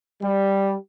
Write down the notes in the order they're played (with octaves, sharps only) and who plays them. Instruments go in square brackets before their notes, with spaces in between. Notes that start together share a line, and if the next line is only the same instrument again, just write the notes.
[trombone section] G3